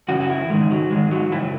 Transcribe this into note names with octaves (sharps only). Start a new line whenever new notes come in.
F#2 C#3 E3 F#4
F#4
E4
G#2 D#3 G#3
F#3
G#2 D#3 G#3
F#3
F#2 C#3 E3 E4